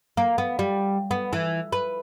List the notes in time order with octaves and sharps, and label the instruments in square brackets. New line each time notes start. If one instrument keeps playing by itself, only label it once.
[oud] A#3
B3
G3
B3
E3
B4